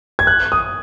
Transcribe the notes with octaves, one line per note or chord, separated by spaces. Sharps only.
G#6
F#6
D#6